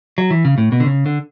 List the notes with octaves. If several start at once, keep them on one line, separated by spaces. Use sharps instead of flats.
F#3
E3
C#3
A2
B2
D3
C#3
D3